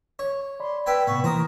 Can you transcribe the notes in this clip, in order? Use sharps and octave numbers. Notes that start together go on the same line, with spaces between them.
C#5
D5 B5 C6
B4 G5 G#5 E6
A2 C3 B3 C#6
E3 A#3 A#4 C5 A#5 D#6